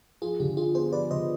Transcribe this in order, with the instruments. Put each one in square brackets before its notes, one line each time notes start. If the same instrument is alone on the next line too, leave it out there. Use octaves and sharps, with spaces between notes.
[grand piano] F3 [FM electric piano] F4 G#4
[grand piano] D3 [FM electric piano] G4
[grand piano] D#4 [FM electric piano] F4 G#4
[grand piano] B3 [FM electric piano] G#4 C5
[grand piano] F3 [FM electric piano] B4 D5
[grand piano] D3 [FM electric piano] C5 D#5